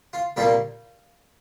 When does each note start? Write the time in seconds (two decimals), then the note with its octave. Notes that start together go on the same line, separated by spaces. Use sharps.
0.13 F4
0.36 C2 A#2 G3 A#3 F4 G4